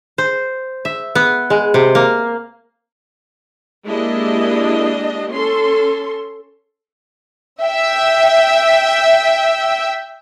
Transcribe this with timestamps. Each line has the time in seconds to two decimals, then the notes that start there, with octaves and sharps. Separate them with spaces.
0.18 C5
0.85 E5
1.15 B3
1.50 G#3
1.74 C3
1.95 A#3
3.86 G#3 A#3 D4 E4 G4 D#5
5.32 C#4 A4 C6
7.62 E5 G5